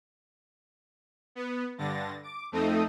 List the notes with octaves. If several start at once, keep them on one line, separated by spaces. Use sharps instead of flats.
B3
G2 D3 A6 A#6
D6
F2 A3 C4 D#4 A4 D#6